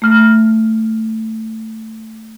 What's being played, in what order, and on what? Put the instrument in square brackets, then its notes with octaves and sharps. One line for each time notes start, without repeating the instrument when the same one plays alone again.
[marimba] A3 F6